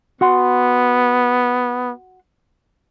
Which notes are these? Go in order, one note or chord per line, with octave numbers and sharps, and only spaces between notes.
B3 F#4 F#5 C6